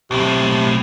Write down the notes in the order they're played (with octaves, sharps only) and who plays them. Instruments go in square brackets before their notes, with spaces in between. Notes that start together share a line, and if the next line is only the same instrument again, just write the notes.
[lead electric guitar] B1 A2 [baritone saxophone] C3